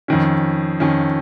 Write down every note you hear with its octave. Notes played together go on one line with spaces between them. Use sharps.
F2 D#3 C#4
F2 D#3 C#4